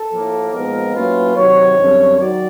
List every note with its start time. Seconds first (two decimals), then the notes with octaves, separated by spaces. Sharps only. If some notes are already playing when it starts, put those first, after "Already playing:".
Already playing: A4
0.12 A2 F3 A#3
0.53 A#2 F3 G#3 B3 D#4 A#4
0.94 A2 F#3 A#3 C#4 F4 B4
1.36 C3 D#3 F#3 C#5
1.77 F#2 D3 G3 C4
2.18 D#3 F#3 D5